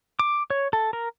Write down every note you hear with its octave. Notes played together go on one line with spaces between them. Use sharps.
D6
C#5
A4
A#4